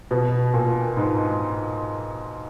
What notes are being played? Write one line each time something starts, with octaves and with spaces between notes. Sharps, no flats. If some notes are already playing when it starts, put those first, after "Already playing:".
B2
A#2
G#2